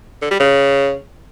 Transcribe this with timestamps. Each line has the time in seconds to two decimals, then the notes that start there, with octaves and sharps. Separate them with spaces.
0.22 D3
0.31 G3
0.40 C#3